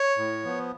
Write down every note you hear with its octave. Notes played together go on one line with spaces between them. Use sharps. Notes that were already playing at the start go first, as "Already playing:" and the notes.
Already playing: C#5
A2
F3 B3